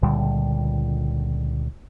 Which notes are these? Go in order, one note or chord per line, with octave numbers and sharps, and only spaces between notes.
C#2 A#2 D3 G3